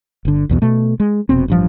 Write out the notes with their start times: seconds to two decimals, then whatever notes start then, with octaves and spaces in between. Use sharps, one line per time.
0.25 G1 D3
0.49 B1 E2 B2
0.62 B2 A3
1.00 G#3
1.29 F1 B2 C4
1.48 A1 G2 F3